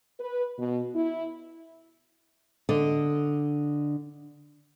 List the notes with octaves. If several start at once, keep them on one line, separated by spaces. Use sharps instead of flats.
B4
B2
E4
D3 D#5